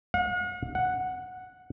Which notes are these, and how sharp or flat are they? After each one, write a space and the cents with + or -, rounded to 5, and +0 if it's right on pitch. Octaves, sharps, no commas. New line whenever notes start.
F#5 -45
F#5 -5